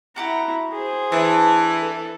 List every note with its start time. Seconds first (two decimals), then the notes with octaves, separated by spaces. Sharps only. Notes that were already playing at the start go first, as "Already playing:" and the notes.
0.16 E4 F#4 G4 F#5 A#5
0.72 G#4 C5
1.12 E3 A3 D4
1.81 A4